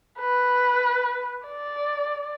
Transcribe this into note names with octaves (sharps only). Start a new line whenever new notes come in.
B4
D5